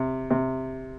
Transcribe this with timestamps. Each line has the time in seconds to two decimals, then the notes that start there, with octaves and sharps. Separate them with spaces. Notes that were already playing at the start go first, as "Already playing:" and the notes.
Already playing: C3
0.31 C3